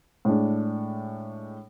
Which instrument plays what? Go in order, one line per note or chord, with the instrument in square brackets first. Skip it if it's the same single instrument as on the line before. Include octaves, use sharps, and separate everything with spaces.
[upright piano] A2 G#3 D4